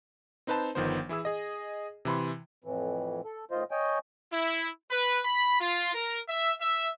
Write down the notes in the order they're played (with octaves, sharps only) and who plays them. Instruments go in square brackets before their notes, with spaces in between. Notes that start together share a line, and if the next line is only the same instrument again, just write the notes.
[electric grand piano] C4 D#4 B4 C5 A5
G1 D#3 F3 B3 C5
E3 E4 G#4 E6
G#4 D#5
C3 E3 B5 C6
[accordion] F2 A2 E3
A4
A2 D#3 F4 C5 D#5
C#5 D#5 G5 G#5
[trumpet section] E4
B4
B5
F4
A#4
E5
E5